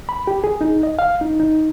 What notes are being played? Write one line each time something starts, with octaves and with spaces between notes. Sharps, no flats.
B5
G4
G#4
D#4
D#5
F5
D#4
D#4